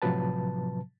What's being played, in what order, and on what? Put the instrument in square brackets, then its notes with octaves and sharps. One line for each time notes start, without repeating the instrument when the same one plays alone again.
[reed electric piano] A2 C3 F3 F#3 B4 A5